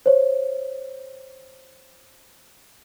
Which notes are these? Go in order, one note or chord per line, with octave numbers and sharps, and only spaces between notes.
C5 C#5